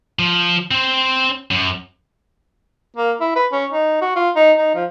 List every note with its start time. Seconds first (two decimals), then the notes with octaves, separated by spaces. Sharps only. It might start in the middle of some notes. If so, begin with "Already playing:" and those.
0.19 F3
0.71 C4 C5
1.51 F#2
2.97 A#3
3.21 E4
3.36 B4
3.53 C#4
3.73 D#4
4.02 F#4
4.16 F4
4.36 D#4
4.58 D#4
4.75 F3